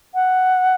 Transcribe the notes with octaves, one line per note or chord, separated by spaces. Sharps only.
F#5